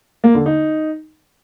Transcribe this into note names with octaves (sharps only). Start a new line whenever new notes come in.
A#3
D3
D#4